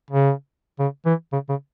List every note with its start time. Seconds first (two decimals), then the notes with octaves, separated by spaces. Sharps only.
0.10 C#3
0.79 C#3
1.06 E3
1.33 C#3
1.49 C#3